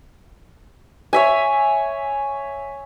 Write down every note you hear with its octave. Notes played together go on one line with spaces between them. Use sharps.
C#5 E5 G#5